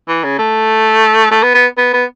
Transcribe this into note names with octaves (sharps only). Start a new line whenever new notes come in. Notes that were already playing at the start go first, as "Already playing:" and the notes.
E3
C#3
A3
A3
B3
B3
B3
B3